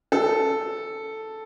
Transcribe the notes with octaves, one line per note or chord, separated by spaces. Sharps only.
A4